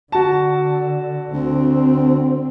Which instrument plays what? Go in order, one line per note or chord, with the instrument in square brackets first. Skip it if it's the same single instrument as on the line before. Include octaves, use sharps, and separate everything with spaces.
[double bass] D3 [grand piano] F#4 A5
[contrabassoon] D2 [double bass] D3 C4